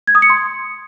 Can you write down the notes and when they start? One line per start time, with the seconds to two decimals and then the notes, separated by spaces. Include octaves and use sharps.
0.07 G#6
0.15 D#6
0.22 C#7
0.30 C6